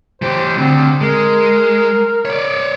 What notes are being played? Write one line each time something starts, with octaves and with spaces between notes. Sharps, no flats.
E3 G4 C5
D2 D3 C4
G#3 A#4
C#5 D5